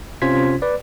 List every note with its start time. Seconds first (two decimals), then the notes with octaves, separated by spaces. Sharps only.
0.22 C3 C#4 F4 C5 G#6 B6
0.62 B4 D5